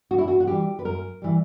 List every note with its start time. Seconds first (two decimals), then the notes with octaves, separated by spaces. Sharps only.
0.11 F#2 F#4
0.18 E4
0.28 F#4
0.40 F#4
0.47 E3 G3 G4
0.79 B4
0.85 F#2 A#4
1.22 E3 G3